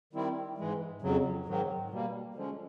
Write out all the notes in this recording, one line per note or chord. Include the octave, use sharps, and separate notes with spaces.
D#3 G3 C4 E4
G#2 E3 G#3
F2 C#3 F#3
G#2 D#3 F#3
B2 G3 A#3
D3 F3 G#3 C#4